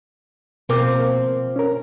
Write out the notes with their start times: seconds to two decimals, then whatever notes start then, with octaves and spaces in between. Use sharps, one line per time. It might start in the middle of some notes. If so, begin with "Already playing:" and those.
0.69 B2 F3 A#3 C4 A#4 D6
1.56 C#4 A#4